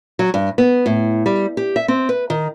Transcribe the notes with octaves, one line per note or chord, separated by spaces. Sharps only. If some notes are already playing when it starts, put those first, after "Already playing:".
F#3
G2
B3
A2
G3
G4
E5
C4
B4
D#3